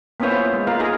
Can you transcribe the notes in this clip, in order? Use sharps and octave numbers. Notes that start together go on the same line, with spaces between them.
A#3 B3 C#4 E4 C5 C#5
F4
G#3
A#3 F4 A#4 B4 F5
D#4 G#4 A#4